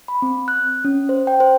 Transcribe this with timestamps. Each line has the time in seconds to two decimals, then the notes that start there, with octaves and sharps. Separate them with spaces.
0.08 B5
0.22 C4
0.48 F#6
0.85 C#4
1.09 C5
1.27 G5
1.40 C5